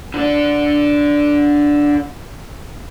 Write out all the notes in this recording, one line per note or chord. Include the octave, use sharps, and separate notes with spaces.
D3 D4